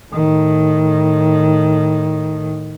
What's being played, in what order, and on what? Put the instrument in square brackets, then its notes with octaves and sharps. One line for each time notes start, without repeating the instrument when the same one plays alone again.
[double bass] A2 D#3